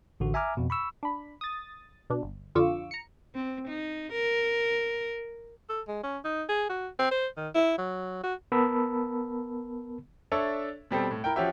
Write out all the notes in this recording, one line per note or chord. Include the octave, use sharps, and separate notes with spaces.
A1 D3 F#4
E5 G#5 A#5 D6 F6
F2 B2
B5 C#6 E6
D4 B5
D#6 A6
B2 D4
G1
F2 D3 F4 C#6 D6 E6
A#5 C#7
C4
D#4
A#4
A4
G#3
C#4
D#4
G#4
F#4
C4
C5
D#3
E4
F#3
F#4
B3 A#4 A5 B5 E6
D4 A4 C#5 E5
B2 G3 C4 A4
A2
E4 A#4 G5
F3 C#4 F#4 G4 E5